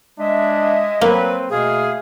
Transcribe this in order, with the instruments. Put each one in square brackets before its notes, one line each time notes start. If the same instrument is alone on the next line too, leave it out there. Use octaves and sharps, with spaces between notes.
[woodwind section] G#3 D#5 E5 [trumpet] D4
[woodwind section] F#3 B4 [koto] A#3 [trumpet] C4
[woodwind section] B2 A3 G#4 [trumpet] F5